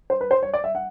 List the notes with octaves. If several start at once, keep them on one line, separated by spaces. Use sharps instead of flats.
C5
B4
C5
C#5
D5
E5
F#5